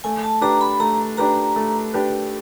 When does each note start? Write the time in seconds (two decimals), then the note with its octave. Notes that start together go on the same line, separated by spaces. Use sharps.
0.04 A3 G#5
0.23 A5
0.41 D4 G4 B4 A#5
0.61 B5
0.80 A3 A#5
1.17 D4 G4 B4 A#5
1.56 A3
1.94 D4 G4 B4